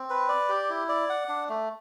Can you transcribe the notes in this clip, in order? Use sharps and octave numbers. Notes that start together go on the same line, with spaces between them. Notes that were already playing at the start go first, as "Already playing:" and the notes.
Already playing: C4
B4
D5
G4
E4
D5
F#5
D4
A3